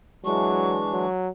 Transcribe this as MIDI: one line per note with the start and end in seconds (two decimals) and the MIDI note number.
0.25 1.06 52
0.25 0.82 54
0.25 1.06 56
0.25 1.06 62
0.25 1.09 85
0.92 1.29 54